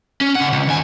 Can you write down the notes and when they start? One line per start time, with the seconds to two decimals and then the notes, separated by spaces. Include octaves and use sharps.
0.21 C#4
0.35 C#3 F#5
0.53 C#2
0.67 D#2 G#5